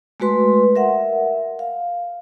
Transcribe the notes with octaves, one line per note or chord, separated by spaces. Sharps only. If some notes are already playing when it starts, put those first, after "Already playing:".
G#3 A3 F#4 B4 C6
A#4 E5 F#5
F5